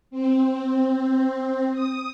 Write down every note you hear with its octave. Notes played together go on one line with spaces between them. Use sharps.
C4
D#6